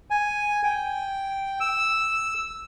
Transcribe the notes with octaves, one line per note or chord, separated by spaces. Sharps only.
G#5
G5
E6